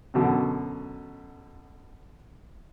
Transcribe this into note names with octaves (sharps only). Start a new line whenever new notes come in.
F#2 B2 D3